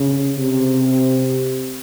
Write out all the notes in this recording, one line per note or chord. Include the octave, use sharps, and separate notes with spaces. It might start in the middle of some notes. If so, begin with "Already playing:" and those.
Already playing: C#3
C3